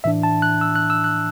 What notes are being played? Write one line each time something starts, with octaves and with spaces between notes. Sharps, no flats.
A2 E3 D4 E5
A5
F#6
E6
F#6
E6
F#6